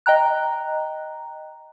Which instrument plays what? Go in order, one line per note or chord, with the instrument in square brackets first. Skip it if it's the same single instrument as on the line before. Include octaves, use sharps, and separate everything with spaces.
[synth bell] D#5 G5 A#5 F#6